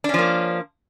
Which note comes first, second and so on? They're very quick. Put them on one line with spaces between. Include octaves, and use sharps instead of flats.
D4 C#4 F3 A#3